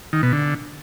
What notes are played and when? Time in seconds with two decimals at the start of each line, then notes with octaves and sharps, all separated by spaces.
0.13 D#3
0.23 B2
0.33 D3